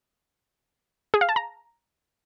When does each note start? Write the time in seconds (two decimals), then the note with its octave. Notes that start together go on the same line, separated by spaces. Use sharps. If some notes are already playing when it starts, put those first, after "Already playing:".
1.14 G#4
1.21 F5
1.29 A5
1.36 A#5